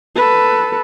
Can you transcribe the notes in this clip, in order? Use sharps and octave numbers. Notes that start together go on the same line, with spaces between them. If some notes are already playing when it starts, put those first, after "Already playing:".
A4 B4